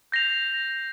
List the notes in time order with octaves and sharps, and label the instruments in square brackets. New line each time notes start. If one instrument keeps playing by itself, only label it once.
[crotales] G6 A#6 C7 F7